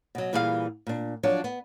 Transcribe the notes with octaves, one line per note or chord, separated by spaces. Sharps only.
B2 F#3
A#2 E3 G3 G#4 A#4 F5
A#2 D4
F3 F#3 D4 C#5
B3